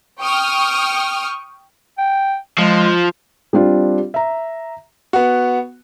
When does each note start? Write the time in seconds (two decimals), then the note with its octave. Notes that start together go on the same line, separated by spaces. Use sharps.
0.21 G5 C#6 D#6 F6
1.98 G5
2.59 F3 G#3
3.53 G3 C4 D4 F4
4.14 E5 A#5
5.13 B3 F#4